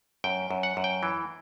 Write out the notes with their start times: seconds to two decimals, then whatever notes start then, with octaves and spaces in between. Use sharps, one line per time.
0.24 F#2 G5
0.51 F#2
0.63 F#5
0.77 F#2
0.84 G5
1.03 E3